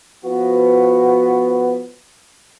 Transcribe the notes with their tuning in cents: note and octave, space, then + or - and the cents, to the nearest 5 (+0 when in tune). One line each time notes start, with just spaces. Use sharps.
F3 +0 B3 +5 F#4 +0